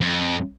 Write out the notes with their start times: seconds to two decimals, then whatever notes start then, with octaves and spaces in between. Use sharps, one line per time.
0.01 F2